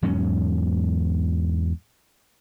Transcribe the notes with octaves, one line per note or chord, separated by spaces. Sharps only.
E2 G#2 F#3 C#4